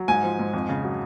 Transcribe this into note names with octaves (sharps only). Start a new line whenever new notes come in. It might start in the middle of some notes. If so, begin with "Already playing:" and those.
Already playing: F#3
G#2 G#5
F3
G#2
F2
C#3
F#3